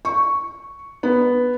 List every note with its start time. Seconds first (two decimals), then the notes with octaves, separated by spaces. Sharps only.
0.05 C#6
1.03 B3